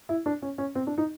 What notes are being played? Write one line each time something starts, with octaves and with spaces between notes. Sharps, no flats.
E4
D4
C#4
C#4
C4
D4
D#4